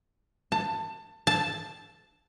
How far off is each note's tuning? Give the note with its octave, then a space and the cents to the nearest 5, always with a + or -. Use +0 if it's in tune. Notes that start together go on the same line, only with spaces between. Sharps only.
A5 +20
A5 +0